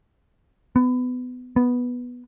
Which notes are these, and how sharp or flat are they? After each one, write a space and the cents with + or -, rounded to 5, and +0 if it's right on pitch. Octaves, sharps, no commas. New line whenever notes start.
B3 +25
B3 -5